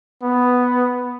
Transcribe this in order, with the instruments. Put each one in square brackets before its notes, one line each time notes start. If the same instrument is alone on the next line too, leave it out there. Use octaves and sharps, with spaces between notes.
[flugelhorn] B3